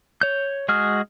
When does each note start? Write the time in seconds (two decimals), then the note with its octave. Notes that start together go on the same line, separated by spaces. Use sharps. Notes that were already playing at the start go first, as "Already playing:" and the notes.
0.21 C#5 G6
0.69 G#3 F#4 G#4 F6